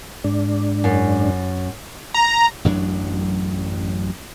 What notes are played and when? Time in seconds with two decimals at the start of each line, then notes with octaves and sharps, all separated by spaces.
0.24 G#2 D4
0.84 F#2
2.14 A#5
2.65 A1 F#2 F#3 D4